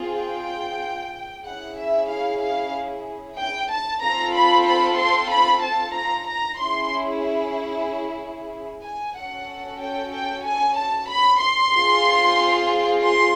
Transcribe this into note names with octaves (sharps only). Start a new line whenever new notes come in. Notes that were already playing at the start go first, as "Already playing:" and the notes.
Already playing: C4 F4 G#4
G5
C#4 E4 G#4 F#5
E5
F5
F5
G5
A5
C4 F4 A4 A#5
B5
B5
C6
B5
A5
A#5
A#5
C#4 E4 G#4 C6
G#5
C#4 F#4 A4 F#5
G5
G5
G#5
A5
B5
C6
C4 F4 G#4
C6